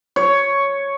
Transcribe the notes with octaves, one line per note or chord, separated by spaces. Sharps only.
C#5